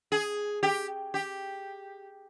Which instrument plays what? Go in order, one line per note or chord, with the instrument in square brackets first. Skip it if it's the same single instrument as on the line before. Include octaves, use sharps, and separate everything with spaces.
[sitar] G#4
G4
G4